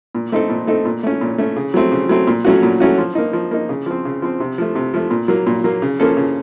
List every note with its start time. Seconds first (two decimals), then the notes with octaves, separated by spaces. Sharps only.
0.15 A#2
0.32 A3 C4 D#4 A4
0.50 A#2
0.67 A3 C4 D#4 A4
0.85 A#2
1.03 A3 C#4
1.21 A#2
1.38 A3 C#4
1.56 C#3
1.74 F#3 A3 C4
1.92 C#3
2.09 F#3 A3 C4
2.27 A#2
2.45 F#3 A3 C#4 F#4
2.63 A#2
2.80 F#3 A3 C#4 F#4
2.98 F3
3.15 A#3 D#4
3.33 F3
3.51 A#3 D#4
3.69 C#3
3.86 F3 C4
4.05 C#3
4.22 F3 C4
4.40 C3
4.58 F3 A3
4.75 C3
4.94 F3 A3
5.11 A#2
5.28 F#3 A#3
5.47 A#2
5.64 F#3 A#3
5.82 C#3
6.00 F3 A#3 C#4 A4
6.17 C#3